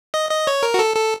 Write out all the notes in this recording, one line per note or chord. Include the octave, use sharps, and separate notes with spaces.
D#5
D#5
C#5
A#4
F#4
A4
A4